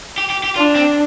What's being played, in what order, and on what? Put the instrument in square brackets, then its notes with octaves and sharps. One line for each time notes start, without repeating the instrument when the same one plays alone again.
[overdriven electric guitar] G4
G4
G4
[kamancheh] D4 [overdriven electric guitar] F4
[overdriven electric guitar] C4